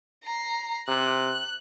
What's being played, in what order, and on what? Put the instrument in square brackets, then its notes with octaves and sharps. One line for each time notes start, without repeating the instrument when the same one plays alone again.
[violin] A#5 C7
[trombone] C3 [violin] F#6